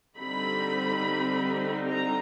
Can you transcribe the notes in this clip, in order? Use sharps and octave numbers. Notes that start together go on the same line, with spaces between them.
D3 G3 C4 D#4 B5
A#5